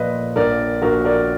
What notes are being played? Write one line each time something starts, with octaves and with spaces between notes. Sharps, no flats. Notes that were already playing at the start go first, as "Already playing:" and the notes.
Already playing: A#2 F3 B4 D#5
A#1 A#4 D5
A#1 F#4 A#4
A#4 D5